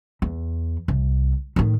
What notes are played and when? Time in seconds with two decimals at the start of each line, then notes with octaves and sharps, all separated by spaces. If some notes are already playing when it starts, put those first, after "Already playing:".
0.22 E2
0.88 C2
1.56 A2 D#3